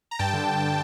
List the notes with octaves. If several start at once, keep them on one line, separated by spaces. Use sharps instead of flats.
A#5
G2 G5 A5
D3